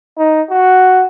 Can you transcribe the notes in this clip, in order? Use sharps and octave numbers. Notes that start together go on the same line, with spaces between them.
D#4
F#4